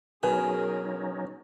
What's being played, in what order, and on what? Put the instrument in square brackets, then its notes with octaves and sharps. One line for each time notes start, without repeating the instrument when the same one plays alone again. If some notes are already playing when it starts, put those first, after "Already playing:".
[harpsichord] B2 [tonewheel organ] F#3 C#4 D#4 [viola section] G#4 A#4 [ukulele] B4 G#5